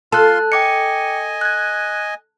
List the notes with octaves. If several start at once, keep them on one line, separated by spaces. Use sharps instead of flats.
F4 A4 A5 C6 F#6
D#5 G5 G#5 D6 C#7
F#6 G#6